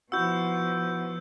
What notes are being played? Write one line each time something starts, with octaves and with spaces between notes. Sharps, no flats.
B2 F3 E4 F#4 F#5 E6 G6